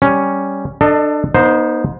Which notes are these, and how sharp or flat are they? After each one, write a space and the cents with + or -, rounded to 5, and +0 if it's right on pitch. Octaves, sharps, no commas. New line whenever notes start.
G3 +0 C#4 +0
D4 +25 A4 +15 D#5 +0
B3 -45 D#4 -10 C5 +0